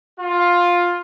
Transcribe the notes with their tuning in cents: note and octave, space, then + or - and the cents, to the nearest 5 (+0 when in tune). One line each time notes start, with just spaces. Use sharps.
F4 +10